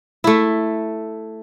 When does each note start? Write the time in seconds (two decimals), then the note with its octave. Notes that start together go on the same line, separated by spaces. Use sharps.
0.24 A3 E4